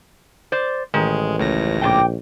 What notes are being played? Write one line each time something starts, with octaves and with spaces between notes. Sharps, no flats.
C5 D5
A1 D#3 G#3
C#2 A2 A#6
A#1 G5 A5 D6